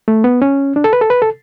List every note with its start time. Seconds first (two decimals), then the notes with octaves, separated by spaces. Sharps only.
0.08 A3
0.24 B3
0.42 C#4
0.76 D4
0.84 A4
0.93 B4
1.01 A4
1.10 B4
1.22 A4